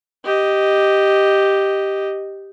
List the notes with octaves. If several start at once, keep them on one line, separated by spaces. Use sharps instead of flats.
G4 D#5